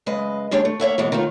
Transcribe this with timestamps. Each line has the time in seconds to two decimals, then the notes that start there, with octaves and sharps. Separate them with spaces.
0.06 F#2 C#3 G#3 B4 D#5
0.51 D#2 G#3 D4 G4 C#5 D5
0.65 A3
0.80 A#3 C#5 E5 F#5
0.98 B2 E3 G#3 B3
1.12 D#3 A3 B3 F4